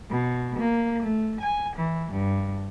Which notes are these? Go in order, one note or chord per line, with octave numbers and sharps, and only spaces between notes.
B2
A#3
A3
G#5
E3
G2